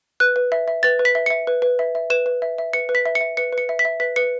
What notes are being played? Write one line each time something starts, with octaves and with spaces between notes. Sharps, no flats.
B4 F#6
B4
E5
E5
B4 A6
B4
B6
E5
E5 C#7
B4
B4
E5
E5
B4 E7
B4
E5
E5
B4 C#7
B4
B6
E5
C#7
E5
B4 C#7
B4
C#7
E5
B6
E5
B4 B6
B4 C#7